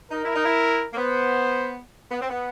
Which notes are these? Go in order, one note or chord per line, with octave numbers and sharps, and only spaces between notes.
D#4 A#4
E4
D#4
E4
A#3
B3 C5
B3
C4
B3